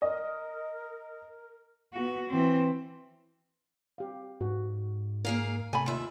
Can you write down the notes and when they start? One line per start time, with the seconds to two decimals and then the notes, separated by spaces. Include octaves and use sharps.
0.02 A#4 D#5
1.94 B3 F#4
2.29 E3 C4
3.98 G4 F5
4.41 G#2 F#4
5.25 A#3 G#4 A#4 F5
5.73 C3 A3 G#5 B5
5.86 D#2 F4 E5